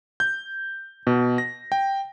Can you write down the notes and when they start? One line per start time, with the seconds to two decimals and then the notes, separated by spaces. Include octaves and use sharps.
0.20 G6
1.07 B2
1.38 A#6
1.72 G5